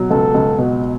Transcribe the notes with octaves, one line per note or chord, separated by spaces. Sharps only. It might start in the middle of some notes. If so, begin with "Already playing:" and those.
Already playing: B2 F#3
C#2 A4
C#2
B2